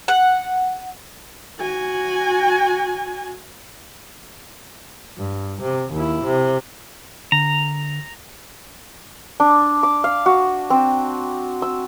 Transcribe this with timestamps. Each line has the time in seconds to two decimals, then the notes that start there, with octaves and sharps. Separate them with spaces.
0.08 F#5
1.59 F#4 G#5
5.18 G2
5.62 C3
5.93 D#2 E4
6.24 C3
7.32 D3 A#5
9.40 D4
9.83 D6
10.04 F5
10.26 F#4
10.70 C4
11.62 E6